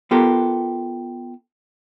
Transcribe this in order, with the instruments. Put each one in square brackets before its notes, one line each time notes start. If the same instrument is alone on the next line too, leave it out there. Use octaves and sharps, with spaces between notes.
[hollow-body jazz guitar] B3 F4 G4 A4 A#4